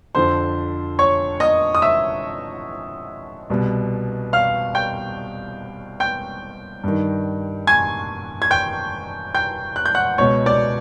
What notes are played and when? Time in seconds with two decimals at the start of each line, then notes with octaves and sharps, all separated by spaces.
0.15 F2 D3 F3 C5 C6
0.99 C#5 C#6
1.40 D#5 D#6
1.75 D#6
1.82 E5 E6
3.50 C2 B2
4.33 F5 F6
4.75 G5 G6
6.00 G5 G6
6.84 G2 D#3
7.67 G#5 G#6
8.42 G#6
8.51 G5 G6
9.35 G5 G6
9.76 F#6
9.86 G6
9.95 F#5 F#6
10.18 C#2 B2 C#5 C#6
10.46 D5 D6